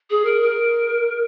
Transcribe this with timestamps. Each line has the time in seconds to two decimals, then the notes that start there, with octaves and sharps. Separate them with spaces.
0.10 G#4
0.25 A#4
0.41 A#4